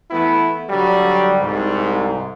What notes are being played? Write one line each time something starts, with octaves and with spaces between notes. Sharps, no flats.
E3 A3 B3 E4
D3 F#3 G3
C2 G#2